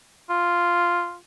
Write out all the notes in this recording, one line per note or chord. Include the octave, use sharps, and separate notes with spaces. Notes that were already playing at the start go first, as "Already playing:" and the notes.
F4